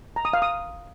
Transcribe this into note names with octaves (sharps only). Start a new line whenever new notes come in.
A#5
D#6
F5
D#6